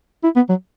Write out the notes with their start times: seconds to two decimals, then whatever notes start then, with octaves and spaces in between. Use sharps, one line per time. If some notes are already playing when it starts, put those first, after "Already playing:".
0.24 E4
0.36 B3
0.49 F#3